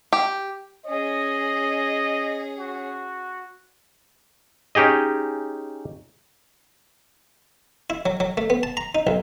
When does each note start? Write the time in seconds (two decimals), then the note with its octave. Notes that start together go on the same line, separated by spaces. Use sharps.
0.13 G4
0.85 C#4 G#4 D#5
2.58 F#4
4.75 C#4 D#4 G4 G#4 D#5
7.90 E4
8.06 F#3
8.20 F#3
8.37 A3
8.50 B3
8.63 A5
8.77 A#5
8.95 D#4
9.07 B1